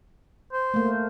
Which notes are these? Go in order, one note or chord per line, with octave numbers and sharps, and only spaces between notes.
C5
A3 A#3